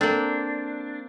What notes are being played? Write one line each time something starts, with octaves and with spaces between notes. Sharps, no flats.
A#3 C4 D4 A4